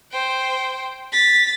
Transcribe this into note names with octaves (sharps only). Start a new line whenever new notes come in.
C5 G5
A6 B6